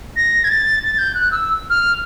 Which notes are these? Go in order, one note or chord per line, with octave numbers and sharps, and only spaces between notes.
A#6
G#6
A6
A6
G6
F#6
E6
F6